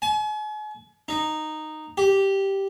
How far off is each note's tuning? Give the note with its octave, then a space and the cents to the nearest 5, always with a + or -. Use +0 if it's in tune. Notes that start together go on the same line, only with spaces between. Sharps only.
G#5 +40
D#4 -10
G4 -5